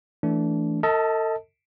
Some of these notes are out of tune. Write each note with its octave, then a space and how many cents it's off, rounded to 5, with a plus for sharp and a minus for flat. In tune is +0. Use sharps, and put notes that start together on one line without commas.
E3 +0 A3 +0 D4 -20
A4 +40 D#5 +35 A5 +0